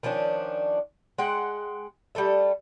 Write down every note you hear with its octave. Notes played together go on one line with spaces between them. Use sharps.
D#3 F3 C#4 D4
G#3 F#5 G5
G3 A3 A4 E5